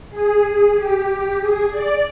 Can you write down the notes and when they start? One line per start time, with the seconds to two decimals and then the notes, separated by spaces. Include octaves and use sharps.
0.10 G#4
0.75 G4
1.06 G4
1.38 G#4
1.70 D5